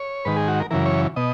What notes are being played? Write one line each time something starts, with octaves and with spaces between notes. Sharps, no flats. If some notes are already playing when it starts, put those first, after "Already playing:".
Already playing: C#5
G#2 D#3 B4
G#4
F#4
A#4
F#2 C#3 E3 A#4
C#5
B2 D#5